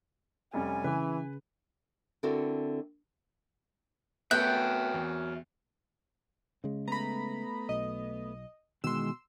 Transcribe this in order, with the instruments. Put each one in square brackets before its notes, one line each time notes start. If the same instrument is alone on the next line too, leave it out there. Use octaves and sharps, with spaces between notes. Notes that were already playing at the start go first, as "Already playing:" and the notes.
[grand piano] F1 G3 C#4 [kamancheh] G#5
[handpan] C#3 [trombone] E3 [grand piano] B4
[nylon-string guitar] D3 C4 E4 F#4 A4 A#4
[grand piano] A3 B3 [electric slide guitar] F#4 C#5 E5 [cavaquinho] G5 [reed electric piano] F#6
[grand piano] E2
[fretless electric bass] C#3 G#3
[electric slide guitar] A3 B3 [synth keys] A#5 B5
[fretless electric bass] B1 [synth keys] D#5
[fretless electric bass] B2 [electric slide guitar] D#3 E3 G#3 [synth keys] C6 E6